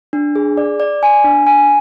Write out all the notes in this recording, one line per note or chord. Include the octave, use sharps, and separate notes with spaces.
D4
G#4
D5
D5
G#5
D4
G#5